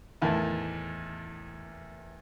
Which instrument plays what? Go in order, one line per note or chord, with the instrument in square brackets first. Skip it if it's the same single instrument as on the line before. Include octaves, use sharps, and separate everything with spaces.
[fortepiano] E2 A2 D#3 A5